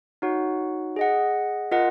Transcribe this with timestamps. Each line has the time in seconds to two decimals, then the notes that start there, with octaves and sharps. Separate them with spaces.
0.22 D#4 F#4 C#5 F#5
0.96 G#4 D#5 F#5
1.72 F4 A#4 D#5 F#5